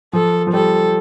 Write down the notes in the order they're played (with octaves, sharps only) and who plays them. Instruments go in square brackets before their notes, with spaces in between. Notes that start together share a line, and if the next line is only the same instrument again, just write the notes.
[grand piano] F3 [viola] A4
[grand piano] F3
[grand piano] G3 [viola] A4